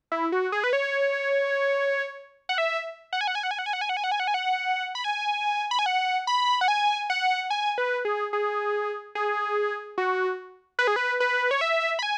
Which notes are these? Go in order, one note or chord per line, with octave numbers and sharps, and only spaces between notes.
E4
F#4
G#4
B4
C#5
F#5
E5
F#5
G#5
F#5
G#5
F#5
G#5
F#5
G#5
F#5
G#5
F#5
G#5
F#5
G#5
F#5
G#5
F#5
B5
G#5
B5
G#5
F#5
B5
F#5
G#5
F#5
G#5
B4
G#4
G#4
G#4
F#4
B4
G#4
B4
B4
C#5
E5
B5
G#5